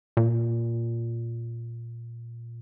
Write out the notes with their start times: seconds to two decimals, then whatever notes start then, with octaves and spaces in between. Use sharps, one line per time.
0.17 A#2